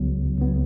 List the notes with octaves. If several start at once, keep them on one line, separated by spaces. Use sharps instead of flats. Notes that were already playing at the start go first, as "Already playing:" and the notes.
Already playing: C#2 C#3 F#3 B3
C#2 C#3 F#3 B3